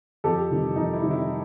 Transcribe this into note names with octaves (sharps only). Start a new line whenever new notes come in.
F2 G4 A4
C3 D#3 G3
F2 D#4
E4
C3 D#3 G3
E4